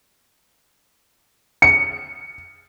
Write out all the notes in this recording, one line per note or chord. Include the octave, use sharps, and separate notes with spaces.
C#7